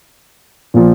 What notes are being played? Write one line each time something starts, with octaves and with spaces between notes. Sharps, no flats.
A#2 F3